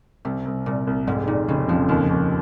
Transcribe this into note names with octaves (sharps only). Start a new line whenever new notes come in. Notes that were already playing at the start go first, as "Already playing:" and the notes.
C2 C3
C2
C2 A#2
C2
F1 G#2
A#2 D#3
F1 C#3
F2 F3
D#2 F3
D#2